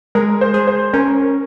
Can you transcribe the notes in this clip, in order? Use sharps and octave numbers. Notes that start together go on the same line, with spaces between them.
G#3 A#4
C5
G#4
C5
C#4 A#4